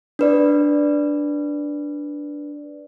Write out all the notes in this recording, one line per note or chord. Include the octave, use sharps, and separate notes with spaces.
D4 B4 D5